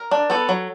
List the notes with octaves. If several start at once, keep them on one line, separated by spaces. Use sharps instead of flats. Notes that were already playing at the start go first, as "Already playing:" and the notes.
Already playing: A#4
D4
B3 A4
F#3